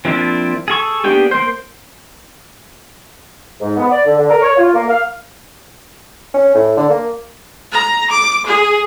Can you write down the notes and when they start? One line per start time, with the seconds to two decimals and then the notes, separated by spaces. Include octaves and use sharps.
0.05 F3 A#3 C4 D4 E4
0.68 G#4 A4 C#6
1.04 A#3 B3 D4 G4 G#4
1.31 A#3 C5
3.61 G#2
3.77 B3
3.91 D5
4.05 D3
4.18 D3
4.30 A#4
4.42 C#5
4.57 F4
4.74 A#3
4.88 F5
6.34 C#4
6.55 A2
6.77 D3
6.90 A#3
7.72 A#5
8.10 D6
8.46 G#4